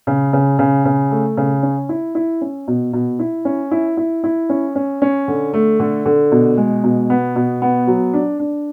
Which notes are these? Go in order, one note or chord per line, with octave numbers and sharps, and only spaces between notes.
C#3
C#3
C#3
C#3
A3
C#3
C#4
E4
E4
C#4
B2
B2
E4
C#4
E4
E4
E4
C#4
C#4
C#4
D3
A3
D3
D3
B2
G#3
B2
B3
B2
B3
F#3
D4
D4